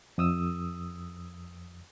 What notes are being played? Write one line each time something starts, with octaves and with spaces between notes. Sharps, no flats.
F2 D#6 E6